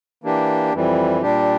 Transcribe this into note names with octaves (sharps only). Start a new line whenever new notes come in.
E3 A#3 D4 G4
F2 E3 G3
A#2 G3 D4 G4